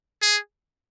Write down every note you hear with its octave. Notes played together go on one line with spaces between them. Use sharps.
G#4